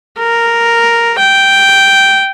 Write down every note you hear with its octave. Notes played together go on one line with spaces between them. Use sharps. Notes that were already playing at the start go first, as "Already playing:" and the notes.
A#4
G5